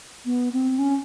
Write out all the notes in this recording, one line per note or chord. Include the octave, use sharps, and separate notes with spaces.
B3
C4
C#4